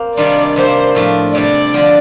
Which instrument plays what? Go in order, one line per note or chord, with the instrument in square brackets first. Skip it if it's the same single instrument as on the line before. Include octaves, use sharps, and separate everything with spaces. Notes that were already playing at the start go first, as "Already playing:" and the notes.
Already playing: [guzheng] A#3 C4
[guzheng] C3 D#3 G3 D4 F4 [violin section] D5
[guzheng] C3 G3 A#3 D4 [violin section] C5
[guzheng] A2 F3 A3 D4 F4
[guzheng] C3 G3 D4 [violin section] D5
[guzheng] D3 F3 C4 F4